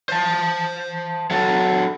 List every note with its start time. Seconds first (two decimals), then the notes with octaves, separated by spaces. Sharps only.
0.09 C5 A5
1.31 F#3 A4